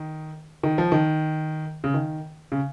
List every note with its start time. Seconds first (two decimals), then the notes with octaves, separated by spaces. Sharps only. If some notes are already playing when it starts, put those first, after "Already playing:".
Already playing: D#3
0.63 D#3
0.78 F3
0.92 D#3
1.84 C#3
1.94 D#3
2.52 C#3